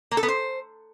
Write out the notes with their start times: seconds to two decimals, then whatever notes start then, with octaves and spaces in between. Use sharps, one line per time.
0.11 A#3
0.17 A4
0.23 B3
0.28 C5